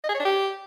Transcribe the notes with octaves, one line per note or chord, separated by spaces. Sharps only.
D#5
G#4
C#5
D4
G4